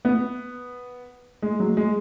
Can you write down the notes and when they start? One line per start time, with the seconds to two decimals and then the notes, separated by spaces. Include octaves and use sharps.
0.05 B3
1.42 G#3
1.60 F#3
1.77 G#3